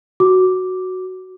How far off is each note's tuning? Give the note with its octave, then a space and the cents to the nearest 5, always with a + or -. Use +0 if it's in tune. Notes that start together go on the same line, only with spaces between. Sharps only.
F#4 +0 D6 +0